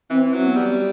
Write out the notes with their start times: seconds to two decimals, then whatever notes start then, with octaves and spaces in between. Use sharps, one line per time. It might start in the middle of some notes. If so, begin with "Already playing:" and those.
0.10 E3 C4
0.34 F#3
0.45 B3
0.57 G3